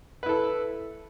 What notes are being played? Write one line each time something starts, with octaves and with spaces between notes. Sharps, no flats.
E4 A4 B4